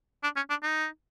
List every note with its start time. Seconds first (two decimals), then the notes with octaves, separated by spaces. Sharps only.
0.23 D4
0.36 C#4
0.50 D4
0.63 D#4